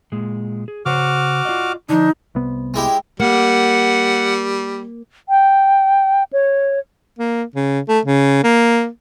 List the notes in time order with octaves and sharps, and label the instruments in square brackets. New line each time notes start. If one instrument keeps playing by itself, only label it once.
[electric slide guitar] A#2 G#3
G#4
[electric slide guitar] C#3 C5 C#5 [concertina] F#4 D6 F6
[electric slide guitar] F4 D5 D#5
[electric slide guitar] D3 F3 [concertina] D4 [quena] D#4
[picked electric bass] C2 C3 B3
[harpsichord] G#3 E4 G4
[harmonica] G3 [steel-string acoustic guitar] A#3 [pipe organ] F#5
[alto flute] G5
C#5
[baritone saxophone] A#3
C#3
A3
C#3
A#3